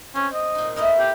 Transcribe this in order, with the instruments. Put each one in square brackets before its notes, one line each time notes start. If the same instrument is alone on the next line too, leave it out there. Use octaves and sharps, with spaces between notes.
[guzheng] C4 [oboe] C#4
[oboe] D#5
[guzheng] A#2 D#4
[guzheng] A3 E4 A#4 [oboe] D#5
[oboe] G4